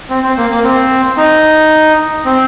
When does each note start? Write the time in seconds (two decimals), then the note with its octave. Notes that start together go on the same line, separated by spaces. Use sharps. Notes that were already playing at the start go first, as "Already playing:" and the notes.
0.10 C4
0.24 C4
0.37 A#3
0.50 A#3
0.64 C4
1.17 D#4
2.26 C4